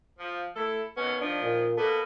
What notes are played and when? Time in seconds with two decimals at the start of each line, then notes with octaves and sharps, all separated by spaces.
0.19 F3
0.56 A3 E4 A4
0.97 D#2 B2 B3 C#4
1.21 D#3 F3 D4
1.42 A#2
1.77 B2 A#3 B3 A4